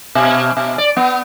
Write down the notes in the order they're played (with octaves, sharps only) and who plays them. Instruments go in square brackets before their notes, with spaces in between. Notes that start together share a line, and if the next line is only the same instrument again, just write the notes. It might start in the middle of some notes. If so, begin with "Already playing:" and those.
[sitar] B2
B2
D5
B3